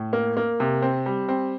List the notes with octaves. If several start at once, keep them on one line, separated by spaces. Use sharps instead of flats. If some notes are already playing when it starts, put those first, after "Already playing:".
Already playing: A2
A#3
A#3
C3
C4
G3
C4